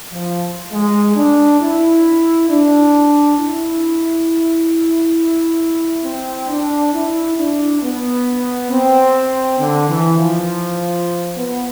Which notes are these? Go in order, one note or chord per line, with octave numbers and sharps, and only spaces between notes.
F3
G#3
D4
E4
D4
E4
C4
D4
E4
D4
B3
C4
D3
E3
F3
B3